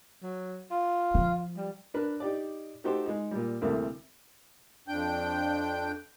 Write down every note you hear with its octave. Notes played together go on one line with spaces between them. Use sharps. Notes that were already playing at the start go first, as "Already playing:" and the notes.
F#3
F4
F3
G3
D4 A#4 B4
D#4 G4 D5
A3 D#4 F#4 G4 A4 C5
G#3 D#4
A#2 G3
D2 C3 E3 G3 A3 A#3
F2 D4 G5 G6